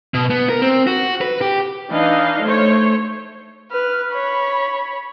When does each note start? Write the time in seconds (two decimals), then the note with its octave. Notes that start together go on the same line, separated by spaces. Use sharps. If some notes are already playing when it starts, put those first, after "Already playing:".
0.14 B2
0.30 B3
0.49 A#4
0.62 C4
0.87 F#4
1.21 B4
1.41 G4
1.91 E3 D4 D#4 D#5 F5
2.43 A3 C5 C#5
3.71 B4 F6
4.11 C#5 B5